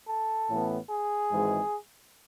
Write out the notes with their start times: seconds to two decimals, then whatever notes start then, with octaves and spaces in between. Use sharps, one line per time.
0.08 A4
0.49 A1 A2 E3 B3
0.90 G#4
1.32 G#1 G#2 E3 G#3